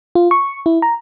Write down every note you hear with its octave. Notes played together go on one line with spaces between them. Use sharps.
F4
C#6
E4
A#5